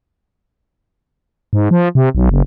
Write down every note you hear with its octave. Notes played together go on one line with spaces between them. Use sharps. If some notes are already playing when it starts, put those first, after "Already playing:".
G#2
F3
C3
B1
F#1